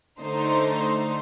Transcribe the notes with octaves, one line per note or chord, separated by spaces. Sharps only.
D3 A3 D#4 C5